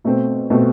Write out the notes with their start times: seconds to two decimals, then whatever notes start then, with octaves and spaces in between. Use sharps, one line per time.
0.04 B2 A3 C4
0.50 B2 A3 C4